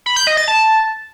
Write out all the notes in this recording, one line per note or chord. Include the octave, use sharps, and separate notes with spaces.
B5
G6
D#5
A6
A5